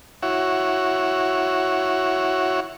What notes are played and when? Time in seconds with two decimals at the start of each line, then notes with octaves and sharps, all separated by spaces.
0.23 E4 F#4 C#5